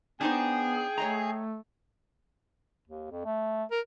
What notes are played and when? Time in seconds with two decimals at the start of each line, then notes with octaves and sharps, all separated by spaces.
0.21 B3 D4 D#4 G#4 C5 G5
0.98 A3 C#5 D#5 A#5
2.88 D#2
3.11 F2
3.25 A3
3.71 A#4